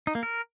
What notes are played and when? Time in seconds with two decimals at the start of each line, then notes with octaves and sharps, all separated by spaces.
0.07 D#4
0.15 A#3
0.23 A#4